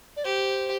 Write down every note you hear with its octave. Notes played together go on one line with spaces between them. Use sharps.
D5
G4 C5